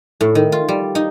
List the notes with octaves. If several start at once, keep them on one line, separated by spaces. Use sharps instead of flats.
A2
D#3
F4
G3
D#4